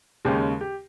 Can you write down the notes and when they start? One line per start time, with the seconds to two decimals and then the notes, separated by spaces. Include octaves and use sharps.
0.25 D#2 C#3 G#3 C#4 G4
0.61 G4